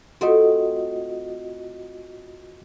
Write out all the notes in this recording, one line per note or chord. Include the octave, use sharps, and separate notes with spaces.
A3 C4 F4 F#4 D#5